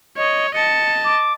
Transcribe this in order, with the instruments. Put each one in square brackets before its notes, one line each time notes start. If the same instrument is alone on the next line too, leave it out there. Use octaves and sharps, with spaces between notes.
[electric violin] C#5 [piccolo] D#5
[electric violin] D#5 A5 [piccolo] C#7
[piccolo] D6